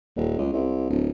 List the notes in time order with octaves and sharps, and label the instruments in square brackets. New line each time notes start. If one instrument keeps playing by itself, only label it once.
[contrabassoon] D#1
C#2
C2
D1